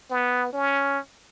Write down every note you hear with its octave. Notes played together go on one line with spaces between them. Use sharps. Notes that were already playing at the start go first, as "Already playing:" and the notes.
B3
C#4